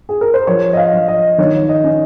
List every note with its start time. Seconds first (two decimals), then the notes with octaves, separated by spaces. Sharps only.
0.09 G#4
0.21 A#4
0.34 C5
0.47 F3 C#5
0.73 D#5
0.77 F5
0.93 F3
1.08 D#5
1.38 D#3 C#5
1.69 D#5
1.84 C#4